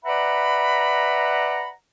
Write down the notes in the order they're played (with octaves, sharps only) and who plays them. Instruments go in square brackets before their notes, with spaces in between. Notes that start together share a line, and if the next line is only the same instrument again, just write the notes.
[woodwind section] B4 D5 E5 F#5 A#5 B5